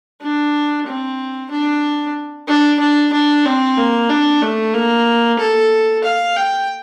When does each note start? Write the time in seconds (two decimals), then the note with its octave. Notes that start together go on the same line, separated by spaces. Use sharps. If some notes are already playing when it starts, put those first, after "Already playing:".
0.21 D4
0.87 C4
1.51 D4
2.47 D4
2.80 D4
3.13 D4
3.45 C4
3.77 A#3
4.09 D4
4.42 A3
4.74 A#3
5.39 A4
6.04 F5
6.36 G5